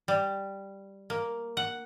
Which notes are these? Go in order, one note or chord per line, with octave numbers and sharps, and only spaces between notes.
G3
A#3
F#5